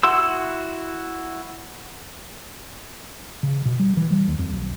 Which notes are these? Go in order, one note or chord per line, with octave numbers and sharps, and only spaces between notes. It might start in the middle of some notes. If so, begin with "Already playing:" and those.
E4 F#4 C6 E6
C#3
B2
G3
E3
G3
D#2
F2
B1